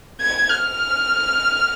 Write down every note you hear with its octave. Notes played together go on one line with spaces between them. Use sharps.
G#6
F6